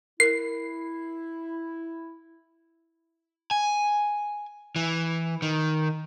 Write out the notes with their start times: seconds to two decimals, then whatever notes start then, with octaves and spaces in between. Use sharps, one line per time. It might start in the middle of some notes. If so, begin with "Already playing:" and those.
0.20 E4 A#4 C7
3.51 G#5
4.76 E3
5.42 D#3